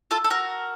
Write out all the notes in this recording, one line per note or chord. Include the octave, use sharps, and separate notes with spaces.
F4 A4
A4
F#4 A#4